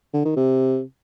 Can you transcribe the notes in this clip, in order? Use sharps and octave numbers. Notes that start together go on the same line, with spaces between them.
D3
D#3
C3